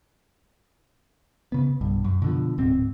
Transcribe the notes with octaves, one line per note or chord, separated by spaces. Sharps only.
C#3 B3
B1 G2
F#2
B2 D3 F3
D1 G#2 C4